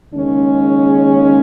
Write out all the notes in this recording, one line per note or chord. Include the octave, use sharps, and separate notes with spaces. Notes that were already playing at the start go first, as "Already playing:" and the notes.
D#2 C#3 G#3 C#4